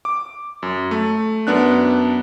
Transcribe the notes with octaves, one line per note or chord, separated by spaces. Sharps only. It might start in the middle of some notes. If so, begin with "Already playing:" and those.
D6
F#2
A3
F#2 B3 D4 F#6